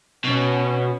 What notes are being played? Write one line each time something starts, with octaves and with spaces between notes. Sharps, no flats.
B2 C#4